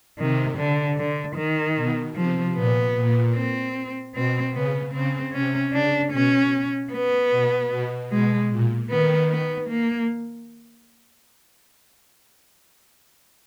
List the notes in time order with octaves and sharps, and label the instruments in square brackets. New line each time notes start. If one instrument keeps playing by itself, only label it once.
[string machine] C3 [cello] D#3
[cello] D3
D3
D#3
[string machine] B2
[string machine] C3 [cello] F3
[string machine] A#2 [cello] B3
[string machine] A#2
[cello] C4
[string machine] B2 [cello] C4
[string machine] C#3 [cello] B3
[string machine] C#3 [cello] C4
[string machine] C3 [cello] C#4
[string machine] C#3 [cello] D4
[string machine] B2 [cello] C#4
[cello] B3
[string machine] B2
B2
[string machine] B2 [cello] G#3
[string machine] A#2
[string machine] D#3 [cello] B3
[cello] B3
A#3